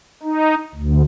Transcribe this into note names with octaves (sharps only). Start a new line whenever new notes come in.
D#4
D2